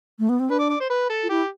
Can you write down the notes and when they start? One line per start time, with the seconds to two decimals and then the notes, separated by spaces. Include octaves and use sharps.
0.19 A3
0.29 B3
0.40 C4
0.50 D4 B4
0.59 D5
0.70 D5
0.80 C5
0.90 B4
1.09 A4
1.23 F4
1.29 E4 G4